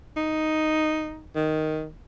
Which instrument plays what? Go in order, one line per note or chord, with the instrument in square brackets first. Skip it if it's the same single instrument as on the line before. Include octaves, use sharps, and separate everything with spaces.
[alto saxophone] D#4
D#3